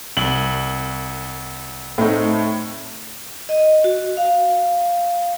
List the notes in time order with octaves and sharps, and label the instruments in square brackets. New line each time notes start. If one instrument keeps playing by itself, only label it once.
[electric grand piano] C2 [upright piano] F#7
[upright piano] A2 [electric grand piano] C4 D#4
[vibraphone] D#5
F#4
F5